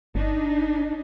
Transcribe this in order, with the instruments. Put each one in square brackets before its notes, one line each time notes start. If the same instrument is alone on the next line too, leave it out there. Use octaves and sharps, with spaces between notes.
[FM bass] G1 [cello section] D4 D#4